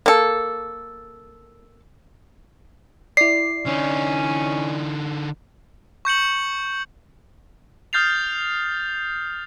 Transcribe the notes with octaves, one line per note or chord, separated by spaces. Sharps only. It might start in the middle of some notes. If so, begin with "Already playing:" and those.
A#3 A4
E4 D5 C7
D3 C#4 D#4
C#6 G6 C#7 F#7
D#6 F6 G6 A6 C7 F7